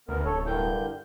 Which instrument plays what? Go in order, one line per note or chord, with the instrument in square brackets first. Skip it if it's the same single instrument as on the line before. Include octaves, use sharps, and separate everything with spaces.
[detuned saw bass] D2 [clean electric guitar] C#3 [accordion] B3 A#4
[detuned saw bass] D1 [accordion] A4 C#5
[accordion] G2 D3 G6 [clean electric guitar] E4 A#4 G5